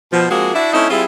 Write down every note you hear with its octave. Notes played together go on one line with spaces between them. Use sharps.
B2 F3
F3 G#3 A#3 C4 F#4 G#4
D4 E4 F#4
A3 C4 C#4 D#4 E4
G3 C4 E4 F4 G#4